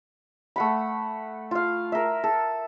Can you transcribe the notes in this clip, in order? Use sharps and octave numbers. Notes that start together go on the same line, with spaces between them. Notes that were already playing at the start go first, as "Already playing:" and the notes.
A3 F#5 B5
F4 F5
A#4 E5
A4